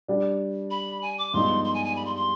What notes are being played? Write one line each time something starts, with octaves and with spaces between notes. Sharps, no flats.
G3 D4 G4
B5
G#5
D6
G2 F3 G#3 B3 D#4 C6
C6
G#5
G#5
B5
C6
C6